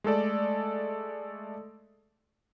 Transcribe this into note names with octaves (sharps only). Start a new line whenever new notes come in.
G#3 A3 A4 D5